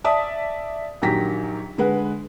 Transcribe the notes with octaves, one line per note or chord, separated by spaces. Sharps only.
D5 E5 A5 D#6
A#1 D#3 F#3 G4 A#6 B6
D3 G#3 B4 F#5